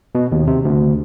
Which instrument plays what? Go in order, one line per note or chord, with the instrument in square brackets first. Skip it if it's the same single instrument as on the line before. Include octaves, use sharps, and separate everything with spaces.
[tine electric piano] B2
D#2
C3
D2